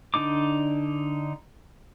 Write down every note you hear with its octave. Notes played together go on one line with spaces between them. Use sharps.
D3 D4 D#4 D6